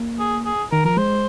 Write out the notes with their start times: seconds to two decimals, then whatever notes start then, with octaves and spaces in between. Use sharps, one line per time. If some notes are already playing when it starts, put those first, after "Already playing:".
Already playing: A#3
0.19 G#4
0.45 G#4
0.72 D#3 A#4
0.85 F3 A#4
0.97 G#3 C5